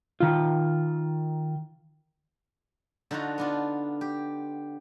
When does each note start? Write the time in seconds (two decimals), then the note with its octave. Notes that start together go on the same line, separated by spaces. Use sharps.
0.20 D#3 F4
3.11 D3 D#4 F4 F#4
3.38 B3 D4 F4
4.01 G4